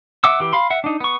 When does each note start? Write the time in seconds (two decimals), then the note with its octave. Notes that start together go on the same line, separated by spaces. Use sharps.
0.24 E5 F#5 D6 E6
0.40 E3 G4
0.53 F5 B5 C6
0.70 E5 F#5
0.84 D4 D#4
1.00 B3 C#6